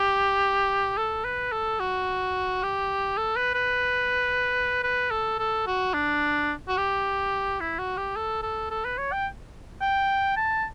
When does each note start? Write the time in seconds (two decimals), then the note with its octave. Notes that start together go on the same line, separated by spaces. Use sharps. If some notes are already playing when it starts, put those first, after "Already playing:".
Already playing: G4
0.97 A4
1.25 B4
1.52 A4
1.80 F#4
2.63 G4
3.17 A4
3.36 B4
3.54 B4
4.83 B4
5.11 A4
5.39 A4
5.67 F#4
5.94 D4
6.68 F#4
6.77 G4
7.60 E4
7.79 F#4
7.97 G4
8.16 A4
8.43 A4
8.70 A4
8.85 B4
8.98 C#5
9.12 G5
9.81 G5
10.37 A5